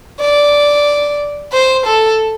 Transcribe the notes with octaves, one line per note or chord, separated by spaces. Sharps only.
D5
C5
A4